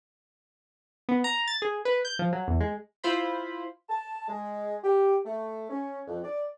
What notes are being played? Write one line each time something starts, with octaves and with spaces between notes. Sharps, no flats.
B3
A#5
A6
G#4
B4
G6
F3
F#3
E2
G#3
E4 F4 C5 B5
A5
G#3
G4
A3
C#4
F2
D5